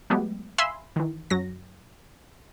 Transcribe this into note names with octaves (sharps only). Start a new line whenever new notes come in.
F#3 G#3 A3 B3 G4
E5 F5 G#5 B5 C6 E6
D#3 E3
F#2 F#3 A#6